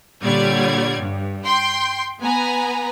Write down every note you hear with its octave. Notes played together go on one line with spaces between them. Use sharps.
A#2 D3 G3 C#5 D5 G#6
G2
G5 C6 G6
B3 B4 G#5 A#5